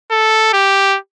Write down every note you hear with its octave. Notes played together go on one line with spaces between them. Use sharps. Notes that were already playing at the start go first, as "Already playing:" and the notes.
A4
G4